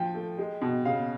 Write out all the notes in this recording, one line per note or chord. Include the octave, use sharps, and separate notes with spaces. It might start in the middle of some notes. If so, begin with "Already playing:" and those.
Already playing: F3 G5
A3
G#3
B2
C#3 F5